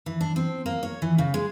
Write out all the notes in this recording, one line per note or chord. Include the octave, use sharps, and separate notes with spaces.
E3
D4
C4
A#3
C#5
E3
C#3
G#3